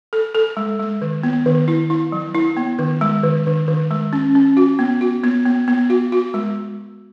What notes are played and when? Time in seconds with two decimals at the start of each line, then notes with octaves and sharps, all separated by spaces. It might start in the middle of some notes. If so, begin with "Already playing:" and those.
0.13 A4
0.35 A4
0.57 G#3
0.79 G#3
1.01 D#3
1.23 B3
1.46 D#3
1.68 E4
1.90 E4
2.12 F#3
2.34 E4
2.57 B3
2.79 D#3
3.01 G#3
3.23 D#3
3.46 D#3
3.68 D#3
3.91 G#3
4.13 C#4
4.35 C#4
4.57 F#4
4.79 B3
5.01 F#4
5.24 B3
5.46 B3
5.68 B3
5.90 F#4
6.12 F#4
6.34 G#3